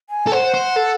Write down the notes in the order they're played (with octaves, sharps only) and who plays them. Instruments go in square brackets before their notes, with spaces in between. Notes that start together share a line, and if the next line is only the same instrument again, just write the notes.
[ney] G#5
[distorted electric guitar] A4
[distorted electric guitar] C5 [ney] F#5
[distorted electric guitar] C5
A4